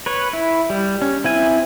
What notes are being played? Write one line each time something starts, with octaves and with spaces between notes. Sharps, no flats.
B4 C#5
E4
G3
C#4
C4 E4 G#5